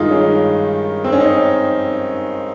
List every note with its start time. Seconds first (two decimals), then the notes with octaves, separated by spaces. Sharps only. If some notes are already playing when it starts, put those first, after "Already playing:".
Already playing: G2 D#3 G#3 D#4 F4
0.11 C#4
1.04 C4
1.12 C#4
1.20 D#4